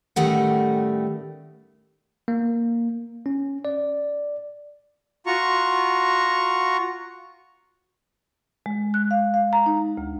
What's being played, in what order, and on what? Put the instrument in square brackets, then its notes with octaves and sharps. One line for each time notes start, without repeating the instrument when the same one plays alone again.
[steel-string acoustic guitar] A2 D#3 G3 A3 C#4 F#5
[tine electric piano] A#3
C#4
D5
[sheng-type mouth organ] F4 F#4 A#5 C#6
[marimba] G#3
F#6
F5
F5
A#5
D#4
D2